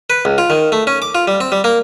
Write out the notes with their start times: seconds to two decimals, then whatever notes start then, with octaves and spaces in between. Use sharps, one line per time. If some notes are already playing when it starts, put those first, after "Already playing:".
0.10 B4
0.25 C#2
0.38 F4
0.50 D#3
0.72 A3
0.87 C#4
1.02 D6
1.15 F4
1.28 G3
1.41 C4
1.52 G3
1.64 A#3